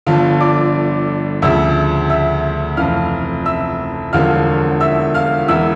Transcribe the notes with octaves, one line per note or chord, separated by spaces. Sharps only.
G1 G2 D3 F3 F4 F5
D5 D6
D2 C#3 F3 E5 E6
E5 E6
F1 F2 E3 F5 F6
E5 E6
E1 E2 D3 F3 F5 F6
E5 E6
F5 F6
E1 E2 E3 E5 E6